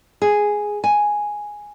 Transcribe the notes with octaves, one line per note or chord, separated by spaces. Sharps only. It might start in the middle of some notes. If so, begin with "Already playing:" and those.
G#4
G#5